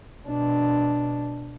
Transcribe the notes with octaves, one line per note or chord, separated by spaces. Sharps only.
B2 D4